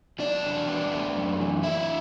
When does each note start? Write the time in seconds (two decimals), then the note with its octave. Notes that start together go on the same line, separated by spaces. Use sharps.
0.19 F#3 D4 D5
0.43 E2
0.67 B3
0.92 A3
1.15 F#2
1.40 E3
1.63 D4 E4 E5